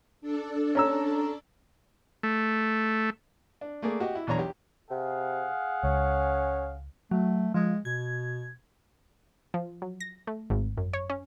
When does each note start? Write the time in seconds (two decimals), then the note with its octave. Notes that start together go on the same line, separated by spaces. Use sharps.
0.21 D4 A4
0.75 C#4 A#5 E6
2.23 A3
3.61 D4
3.82 A3 A#3 G#4 D5
4.00 F#4 G4 D#5
4.15 E4
4.27 B1 E2 D4 C#5 A#5
4.39 G4
4.91 C3 G#4 F5 F#5
5.83 C#2 C#4
7.11 F#3 A3
7.54 F3 G#3
7.85 B2 G#6
9.54 F3
9.82 F#3
10.00 A#6
10.27 A3
10.50 G#1
10.77 F#2
10.93 C#5
11.10 C#4